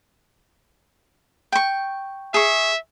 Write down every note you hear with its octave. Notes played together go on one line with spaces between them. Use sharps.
G5 C#6
G#4 E5 C#6